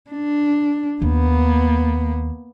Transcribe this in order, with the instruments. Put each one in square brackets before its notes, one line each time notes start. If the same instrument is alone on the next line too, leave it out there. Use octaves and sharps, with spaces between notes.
[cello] D4
[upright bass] D#2 [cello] A#3 B3